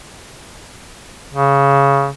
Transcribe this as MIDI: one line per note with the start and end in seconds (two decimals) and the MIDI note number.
1.33 2.08 49